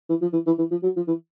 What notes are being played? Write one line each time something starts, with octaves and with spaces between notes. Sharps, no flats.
E3
F3
E3
E3
E3
F3
F#3
F3
E3